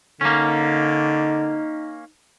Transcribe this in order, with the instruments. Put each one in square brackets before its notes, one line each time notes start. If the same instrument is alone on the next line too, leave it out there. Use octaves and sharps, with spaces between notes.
[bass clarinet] D3 [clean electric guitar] A#3 C#4 [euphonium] D#4